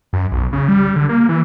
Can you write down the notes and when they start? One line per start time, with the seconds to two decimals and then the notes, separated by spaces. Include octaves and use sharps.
0.13 F#2
0.32 B1
0.53 C#3
0.68 G3
0.96 D3
1.09 A#3
1.29 E3